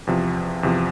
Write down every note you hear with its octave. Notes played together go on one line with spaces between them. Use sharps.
E2 C3 F3
E2 C3 F3